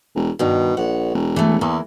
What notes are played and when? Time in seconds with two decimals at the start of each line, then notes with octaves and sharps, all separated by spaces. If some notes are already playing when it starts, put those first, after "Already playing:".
0.15 E1
0.39 G2 B2 D#3
0.77 A#1 F#5
1.14 E1
1.36 E3 A3
1.61 E2 E3 A#3